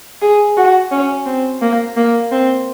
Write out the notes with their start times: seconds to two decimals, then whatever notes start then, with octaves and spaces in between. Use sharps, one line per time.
0.22 G#4
0.57 F#4
0.91 C#4
1.26 C4
1.62 A#3
1.97 A#3
2.32 C4